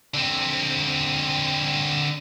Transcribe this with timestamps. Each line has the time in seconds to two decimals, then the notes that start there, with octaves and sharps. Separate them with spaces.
0.14 D3 C4